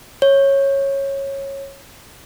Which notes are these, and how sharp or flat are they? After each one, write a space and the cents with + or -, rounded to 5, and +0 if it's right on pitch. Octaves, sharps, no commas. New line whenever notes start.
C#5 -15